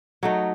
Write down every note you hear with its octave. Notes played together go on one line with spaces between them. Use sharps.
F#3 A3 D#4